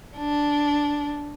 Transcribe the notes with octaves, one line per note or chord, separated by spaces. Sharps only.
D4